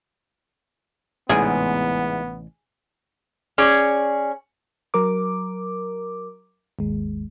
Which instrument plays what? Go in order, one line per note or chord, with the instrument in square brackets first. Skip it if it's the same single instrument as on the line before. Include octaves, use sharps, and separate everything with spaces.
[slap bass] A1 C3 [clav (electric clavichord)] E2 G#2 [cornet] B3 [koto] G#4
[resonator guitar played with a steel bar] C#4 G#4 D5
[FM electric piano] F#3 A#4 D6
G#1 D#2 G#3